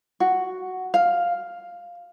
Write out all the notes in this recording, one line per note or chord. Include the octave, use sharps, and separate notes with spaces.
F#4
F5